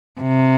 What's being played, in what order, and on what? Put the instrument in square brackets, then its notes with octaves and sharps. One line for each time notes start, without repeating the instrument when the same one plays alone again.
[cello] C3